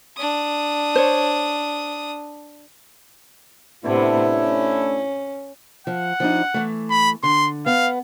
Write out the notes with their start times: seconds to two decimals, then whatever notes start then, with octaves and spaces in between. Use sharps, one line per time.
0.17 D4 D#6
0.96 C5 C#5
3.83 A2 C3 A3 B3 D4 E4
4.35 C#4
5.87 F3 F#5
6.20 F3 D4 D#4
6.54 E3 A3
6.90 B5
7.23 D3 C6
7.66 B3 F5